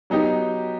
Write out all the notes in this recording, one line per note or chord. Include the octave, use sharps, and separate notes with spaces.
F#3 B3 D#4 G4